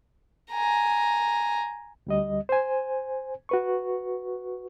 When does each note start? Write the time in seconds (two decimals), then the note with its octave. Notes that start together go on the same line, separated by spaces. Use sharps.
0.51 G#5 A#5
2.07 D2 G3 D#5
2.49 C5 G#5
3.49 F#4 B4 C#6